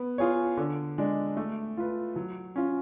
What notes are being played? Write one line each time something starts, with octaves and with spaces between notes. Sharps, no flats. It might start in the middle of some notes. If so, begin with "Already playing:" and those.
Already playing: B3
F4 G#4 C#5
D3
G#3 D4
A3
F4 B4
F#3
C#4 F4